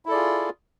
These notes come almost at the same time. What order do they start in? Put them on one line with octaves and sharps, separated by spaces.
E4 A4 D5 G#4 F4